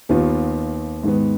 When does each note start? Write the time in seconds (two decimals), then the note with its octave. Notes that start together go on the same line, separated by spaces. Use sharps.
0.09 D#2 D#3 B3 F4
1.03 G#2 D#3 B3